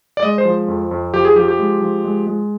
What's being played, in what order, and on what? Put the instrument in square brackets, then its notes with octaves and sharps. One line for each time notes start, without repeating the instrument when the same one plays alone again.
[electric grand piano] D5
G#3 D#5
C5
F3
F2
F2
F3 G4
G#4
F3 G4
G4
G#3
F3
G#3
G#3